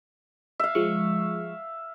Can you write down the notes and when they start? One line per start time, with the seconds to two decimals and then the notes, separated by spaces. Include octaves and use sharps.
0.59 E5 F5
0.75 F3 G#3 C#6